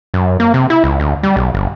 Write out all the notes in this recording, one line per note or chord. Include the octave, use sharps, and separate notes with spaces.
F#2
A#3
C3
E4
C#2
D2
G3
B1
G1